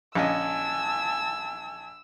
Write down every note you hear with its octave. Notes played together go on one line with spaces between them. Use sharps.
A#1 C#4 D#5 G#5 A5 E6